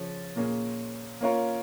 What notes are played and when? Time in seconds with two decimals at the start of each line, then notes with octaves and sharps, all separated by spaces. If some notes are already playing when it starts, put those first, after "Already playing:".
Already playing: C#3 F3 C#4
0.36 A#2 A#3 C#4 G#4
1.21 A#3 C#4 F4 A#4 C#5